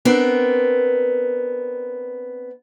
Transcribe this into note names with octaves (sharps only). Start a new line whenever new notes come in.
B3 C4 D4 A#4